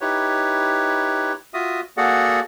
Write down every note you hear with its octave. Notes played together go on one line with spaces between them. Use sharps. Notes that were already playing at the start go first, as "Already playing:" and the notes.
D#4 E4 G4 B4 C#5
F4 F#4 E5 D#6
A#3 F#4 G#4 A4 D5 F#5